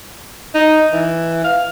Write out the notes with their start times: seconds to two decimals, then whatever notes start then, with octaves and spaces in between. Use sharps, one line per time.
0.55 D#4
0.93 E3
1.44 F5